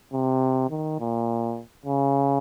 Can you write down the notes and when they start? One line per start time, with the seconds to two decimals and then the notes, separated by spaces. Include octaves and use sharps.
0.13 C3
0.71 D#3
1.00 A#2
1.86 C#3